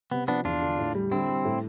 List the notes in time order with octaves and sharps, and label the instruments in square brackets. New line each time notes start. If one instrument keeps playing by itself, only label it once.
[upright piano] C3 [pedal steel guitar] B3
[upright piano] F3 [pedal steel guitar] B3 D4
[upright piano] E2 [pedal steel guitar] D4 F4
[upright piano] D3
A2
G3
[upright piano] D3 [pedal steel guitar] C4 E4
[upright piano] G3
A2